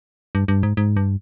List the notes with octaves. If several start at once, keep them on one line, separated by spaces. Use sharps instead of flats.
G2
G2
G#2
G#2
G2